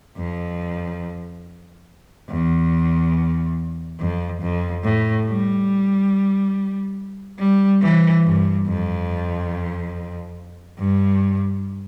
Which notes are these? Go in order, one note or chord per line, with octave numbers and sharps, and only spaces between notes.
F2
E2
F2
F2
A2
G3
G3
E3
G2
F2
G2